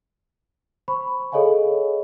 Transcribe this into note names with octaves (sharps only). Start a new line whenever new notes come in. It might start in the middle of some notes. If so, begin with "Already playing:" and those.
C5 B5 C#6
G#4 A4 C#5 D#5 F5 G#5